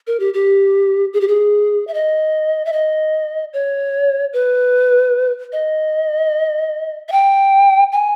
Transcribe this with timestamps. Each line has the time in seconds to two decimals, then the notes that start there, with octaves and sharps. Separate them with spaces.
0.07 A#4
0.20 G4
0.34 G4
1.13 G#4
1.21 G4
1.28 G#4
1.87 E5
1.94 D#5
2.65 E5
2.73 D#5
3.53 C#5
4.33 B4
5.52 D#5
7.08 E5
7.12 G5
7.92 G#5